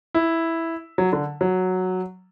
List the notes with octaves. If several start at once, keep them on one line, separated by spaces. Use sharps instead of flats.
E4
F#3
D3
F#3